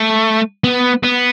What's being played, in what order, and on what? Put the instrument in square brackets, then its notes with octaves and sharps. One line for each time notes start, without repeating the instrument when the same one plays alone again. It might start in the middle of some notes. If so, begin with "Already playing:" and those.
Already playing: [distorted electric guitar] A3
B3
B3